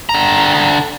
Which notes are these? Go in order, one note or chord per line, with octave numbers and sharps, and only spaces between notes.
D3 A#5